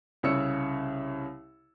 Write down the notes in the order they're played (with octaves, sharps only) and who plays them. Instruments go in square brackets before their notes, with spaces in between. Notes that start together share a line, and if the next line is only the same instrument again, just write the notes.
[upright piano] C2 C#3 C#5 E6 C#7